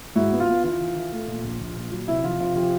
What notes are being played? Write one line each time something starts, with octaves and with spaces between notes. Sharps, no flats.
G#2 E4 F#4
B3
F4
B3
E3 F4
E3
E3
A3
A#2
A#1
A#1
A#2
F#3
C3 E4
F3 F4
C3 F4
F3 F4 G4